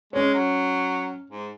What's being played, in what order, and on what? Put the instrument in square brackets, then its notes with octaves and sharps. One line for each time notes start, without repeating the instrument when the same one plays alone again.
[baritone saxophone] G#3 [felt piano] C#4 C#5
[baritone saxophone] F#3
G#2